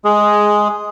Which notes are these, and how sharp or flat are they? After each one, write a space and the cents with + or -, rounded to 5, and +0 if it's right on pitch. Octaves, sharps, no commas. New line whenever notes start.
G#3 +10 G#4 +0